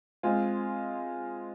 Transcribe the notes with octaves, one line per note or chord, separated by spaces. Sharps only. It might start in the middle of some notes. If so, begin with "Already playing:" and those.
G#3 C4 F4 G#4